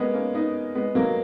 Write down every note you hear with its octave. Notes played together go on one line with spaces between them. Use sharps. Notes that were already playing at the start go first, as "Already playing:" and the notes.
Already playing: G#3 A#3 B3 C#4
A#3 C#4
B3 D#4
G#3 B3
F#3 A#3